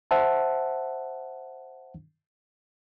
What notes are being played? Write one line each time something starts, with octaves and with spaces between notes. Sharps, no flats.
C5 E5 F#5 A5